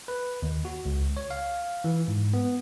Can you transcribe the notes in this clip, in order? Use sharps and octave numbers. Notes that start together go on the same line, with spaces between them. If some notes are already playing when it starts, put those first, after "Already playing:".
B4
D#2
F#4
C#2
C#5
F5
E3
G#2
B3